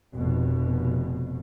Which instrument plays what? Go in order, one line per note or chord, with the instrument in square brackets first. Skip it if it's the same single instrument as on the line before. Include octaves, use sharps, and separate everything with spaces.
[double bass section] F1 B2